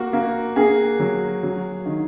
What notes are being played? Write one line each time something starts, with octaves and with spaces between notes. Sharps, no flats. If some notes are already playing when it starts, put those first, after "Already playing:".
Already playing: A#3 F#4
A#3
A#3 G#4
F#3
F#3
D#3